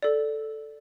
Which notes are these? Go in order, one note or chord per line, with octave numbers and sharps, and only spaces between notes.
A4 D5